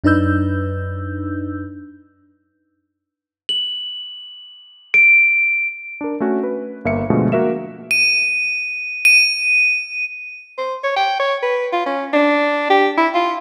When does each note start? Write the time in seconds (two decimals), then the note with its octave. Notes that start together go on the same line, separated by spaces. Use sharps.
0.04 F#2 D4 D#4 B4 E6 G6
3.49 F#7
4.94 D7
6.01 D4 A#4
6.20 A3 C#4 F#4
6.43 B4
6.85 G1 A#3 E5 C#7
7.10 B2 D3 F3 G#3 A3
7.32 A#3 F#4 A#4 E5 E7
7.91 D#7
9.05 D#7
10.58 C5
10.84 C#5
10.97 G5
11.20 C#5
11.43 B4
11.73 F4
11.86 C#4
12.13 D4
12.70 G4
12.98 E4
13.15 F4